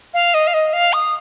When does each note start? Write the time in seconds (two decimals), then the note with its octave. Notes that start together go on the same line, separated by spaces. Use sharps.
0.14 F5
0.34 D#5
0.47 F5
0.54 D#5
0.73 F5
0.93 D#6